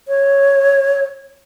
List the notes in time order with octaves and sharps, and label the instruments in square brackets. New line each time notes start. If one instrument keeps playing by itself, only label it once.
[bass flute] C#5